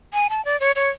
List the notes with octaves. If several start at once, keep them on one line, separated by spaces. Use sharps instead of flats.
G#5
A5
D5
C#5
C#5